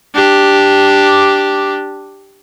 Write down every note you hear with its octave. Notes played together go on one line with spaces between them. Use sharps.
D4 G4